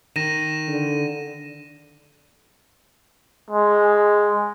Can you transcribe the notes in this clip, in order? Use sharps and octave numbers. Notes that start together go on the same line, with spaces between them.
D#3 A#6 D#7 E7
D3
G#3